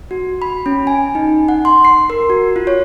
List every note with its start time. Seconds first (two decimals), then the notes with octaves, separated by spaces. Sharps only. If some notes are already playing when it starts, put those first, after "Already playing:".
0.11 F#4
0.42 B5
0.66 C#4
0.87 G#5
1.15 D#4
1.49 F#5
1.65 C6
1.85 C7
2.10 A#4
2.30 F#4
2.56 F4
2.67 C#5